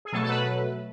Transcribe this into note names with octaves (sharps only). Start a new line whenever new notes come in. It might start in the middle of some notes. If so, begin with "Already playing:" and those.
G#4
B2 F#3 A3 A4
A4
B4